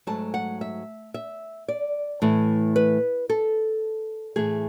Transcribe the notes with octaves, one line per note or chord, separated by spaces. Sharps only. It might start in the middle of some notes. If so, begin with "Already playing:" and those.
G#2 F#3 A3 A5
F#5
E5
E5
D5
A2 E3 A3
B4
A4
A2 E3 A3 G#4